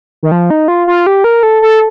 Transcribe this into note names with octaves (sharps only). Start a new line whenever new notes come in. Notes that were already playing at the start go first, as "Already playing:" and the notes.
D#3
F3
D#4
F4
F4
G4
A#4
A4
A4